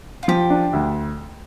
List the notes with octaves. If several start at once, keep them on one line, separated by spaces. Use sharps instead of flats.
F4
F3 G4
D4
D2